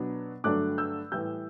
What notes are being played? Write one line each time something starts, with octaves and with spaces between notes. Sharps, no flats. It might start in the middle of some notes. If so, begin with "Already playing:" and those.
Already playing: B2 F#3 B3 D4
G2 D3 F#3 A3 D4 D6 F#6
E6 G6
A2 E3 G3 E6 G6